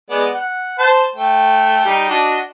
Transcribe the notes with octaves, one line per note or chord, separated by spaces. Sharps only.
G#3 B3 D5
F#5
C5 A5
A3 G5
G3 D#4 G4
D4 F#4 D#5